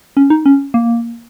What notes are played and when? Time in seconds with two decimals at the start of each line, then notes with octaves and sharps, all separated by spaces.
0.17 C#4
0.30 D#4
0.46 C#4
0.74 A#3